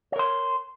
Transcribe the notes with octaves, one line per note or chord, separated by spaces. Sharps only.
A#4 C#5 C6